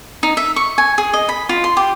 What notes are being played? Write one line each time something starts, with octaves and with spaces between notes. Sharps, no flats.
D#4
E5
C#6
G#5
G#4
D#5
B5
F4
C6
G4